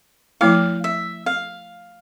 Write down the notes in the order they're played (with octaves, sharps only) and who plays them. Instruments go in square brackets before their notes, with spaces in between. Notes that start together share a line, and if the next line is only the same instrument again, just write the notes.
[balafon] F3 A3 E4 [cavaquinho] F5
[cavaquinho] E5
F5